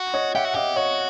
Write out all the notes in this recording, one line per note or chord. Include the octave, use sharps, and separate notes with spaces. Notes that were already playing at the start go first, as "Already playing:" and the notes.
Already playing: F#4
C#5 D#5
G4 E5 F#5
F#4
G4 D#5 F5
F#4 C#5 D#5